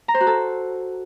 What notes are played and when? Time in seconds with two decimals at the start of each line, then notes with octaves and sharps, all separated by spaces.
0.08 A#5
0.14 C5
0.21 F#4
0.27 A4